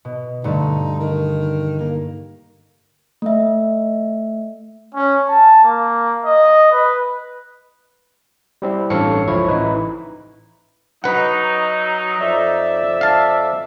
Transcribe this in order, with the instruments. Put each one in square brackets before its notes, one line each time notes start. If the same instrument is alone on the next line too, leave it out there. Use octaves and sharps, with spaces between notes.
[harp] B2
[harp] G2 D3 A3 [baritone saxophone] D#4
[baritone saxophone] D#3
A#3
[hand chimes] A3 E5
[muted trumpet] C#4
A5
A#3
D#5
B4
[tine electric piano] G3 C4 E4
A1 G2 A4 C#5 F5 C#7
C#2 F3 E4 C#5 G#6
A1 D#4 E4 B4
[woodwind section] F#3 [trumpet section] D#4 [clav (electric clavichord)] B4 F#5
[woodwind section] F2 D5 E5
[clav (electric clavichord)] F5 A5